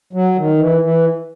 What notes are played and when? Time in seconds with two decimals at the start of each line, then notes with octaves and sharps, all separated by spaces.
0.13 F#3
0.36 D#3
0.58 E3
0.81 E3